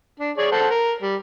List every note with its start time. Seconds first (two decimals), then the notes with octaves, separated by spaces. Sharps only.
0.20 D4
0.38 G#4 C#5 D5
0.52 A4 C5 F#5
0.70 A#4
1.02 G3